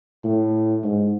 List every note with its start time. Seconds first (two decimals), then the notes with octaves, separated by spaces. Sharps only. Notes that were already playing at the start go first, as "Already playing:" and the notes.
0.24 A2
0.84 G#2